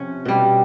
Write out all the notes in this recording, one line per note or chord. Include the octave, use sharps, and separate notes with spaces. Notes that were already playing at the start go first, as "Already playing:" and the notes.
Already playing: C3 F3 C#4
B2 G3